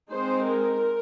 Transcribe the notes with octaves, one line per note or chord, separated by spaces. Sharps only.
G#3 C4 D#4 C5
A#4